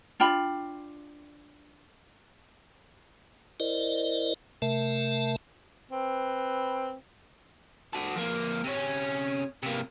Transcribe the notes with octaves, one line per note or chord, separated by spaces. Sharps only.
D4 F4 G5 B5
E4 A#4 C5 D5 D#5
C3 A3 A#4 E5 A5
C4 B4
F#4 A4
F2 A#3
C3 C#4
C3 A#3